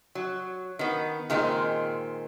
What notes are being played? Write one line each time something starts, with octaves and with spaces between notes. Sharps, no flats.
F#3
D#3 B3
A#2 D#3 G#3 C4